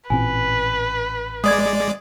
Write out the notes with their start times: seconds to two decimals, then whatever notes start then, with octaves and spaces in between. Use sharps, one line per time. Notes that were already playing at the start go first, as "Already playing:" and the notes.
0.10 A1 A#2 C4 B4 G#5
1.44 G#3 D5 D#6 G#6